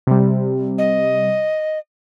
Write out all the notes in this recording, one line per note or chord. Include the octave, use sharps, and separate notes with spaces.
C3 G3
D#5